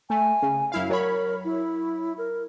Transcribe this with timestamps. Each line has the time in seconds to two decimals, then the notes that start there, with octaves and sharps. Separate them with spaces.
0.10 A3 G#5
0.42 C#3
0.72 F#2 E4 F5
0.89 F#3 A#4 C#5 B5
1.45 E4
2.18 A#4